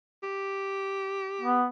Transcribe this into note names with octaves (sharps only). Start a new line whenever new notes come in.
G4
B3